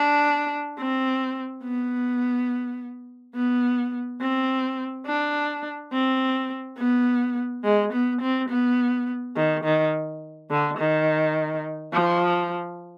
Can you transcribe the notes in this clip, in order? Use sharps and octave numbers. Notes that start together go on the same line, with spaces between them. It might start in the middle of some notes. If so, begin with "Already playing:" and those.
Already playing: D4
C4
B3
B3
C4
D4
C4
B3
G#3
B3
C4
B3
D#3
D#3
D3
D#3
F3